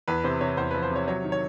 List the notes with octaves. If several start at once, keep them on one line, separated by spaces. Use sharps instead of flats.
E2 B4
C3 C5
C3 C#5
E2 C5
F3 B4
C5
C3 C#5
F#3 C#5
D#3
C#5